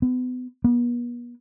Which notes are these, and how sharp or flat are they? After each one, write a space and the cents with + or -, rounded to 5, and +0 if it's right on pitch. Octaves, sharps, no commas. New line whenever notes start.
B3 +30
B3 -40